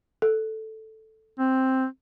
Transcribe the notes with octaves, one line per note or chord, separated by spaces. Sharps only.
A4
C4